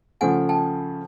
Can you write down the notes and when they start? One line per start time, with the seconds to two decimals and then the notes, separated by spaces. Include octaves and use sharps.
0.21 C#3 F3 A3 F#5 G#5
0.49 G5 A5